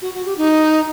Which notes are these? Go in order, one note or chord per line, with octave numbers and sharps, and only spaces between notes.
F#4
F#4
G4
D#4